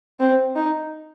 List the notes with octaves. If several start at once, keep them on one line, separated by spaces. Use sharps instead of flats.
C4
D#4